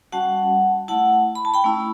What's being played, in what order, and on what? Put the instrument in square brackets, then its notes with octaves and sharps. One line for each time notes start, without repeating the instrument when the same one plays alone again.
[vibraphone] G3 C#4 F#4 F#5 A5
A3 E4 F#5 A5
B5
A5
G5 B5
A3 C#4 E4